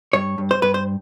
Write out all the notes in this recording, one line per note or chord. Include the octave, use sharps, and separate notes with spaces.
G2 C#5
G2
C5
G2 B4
C5